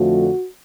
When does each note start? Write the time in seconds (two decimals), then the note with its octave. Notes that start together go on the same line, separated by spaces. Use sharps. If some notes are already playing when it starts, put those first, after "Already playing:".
Already playing: F2 D3 F3 A3 F#4